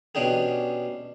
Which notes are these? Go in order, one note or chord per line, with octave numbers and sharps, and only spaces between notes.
B2 C#4 D4 G4 G#4